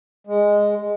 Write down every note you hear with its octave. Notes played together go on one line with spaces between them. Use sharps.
G#3